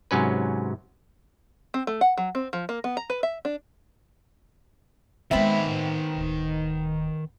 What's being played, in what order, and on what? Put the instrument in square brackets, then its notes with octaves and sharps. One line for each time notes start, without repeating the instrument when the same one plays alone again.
[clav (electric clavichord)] G#2 C3 F#3 C#4 B4
[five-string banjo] C4
A3
F#5
F#3
C4
F3
A#3
B3
A#5
B4
E5
D4
[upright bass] F2 G#3 [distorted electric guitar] D#3 B5 [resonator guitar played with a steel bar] B3 C4 E5
[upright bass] A2
D1 G1